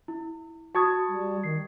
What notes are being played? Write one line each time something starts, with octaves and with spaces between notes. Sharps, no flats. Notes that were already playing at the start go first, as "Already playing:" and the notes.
E4
F#4 A5 C#6 D#6 G#6
G3
D#3 C7